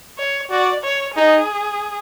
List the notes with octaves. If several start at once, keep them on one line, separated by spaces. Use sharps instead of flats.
C#5
F#4 D5
C#5
D#4 G#4